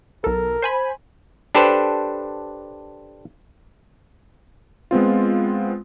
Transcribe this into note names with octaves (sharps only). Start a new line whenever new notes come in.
B1 A4 A#4
C5 G#5 B5
D4 G4 A4 B4 C5
G#3 B3 C4 F4